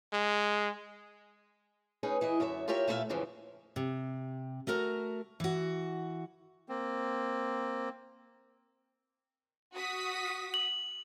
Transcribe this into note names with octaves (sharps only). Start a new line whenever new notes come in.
G#3
C#4 D#4 G#4 B4
E3 E4 G#4 D#5
F#2 D3 C#5 E5
F4 G4 A#4 C#5 E5 G5
A#2 A3 E4 A4 E5 F5
F2 G#2 C#3 E3 F3
C3
A3 F#4 A#4 A#5
E3 F#4
A#3 C4
F#4 D#6 B6
F#7